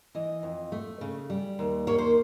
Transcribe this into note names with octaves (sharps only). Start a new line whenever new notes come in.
E3 D#5
F2
A3
C#3
G3
D#2
A#3 C#5
C5